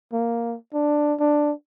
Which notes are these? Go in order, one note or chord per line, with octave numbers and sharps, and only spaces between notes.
A#3
D4
D4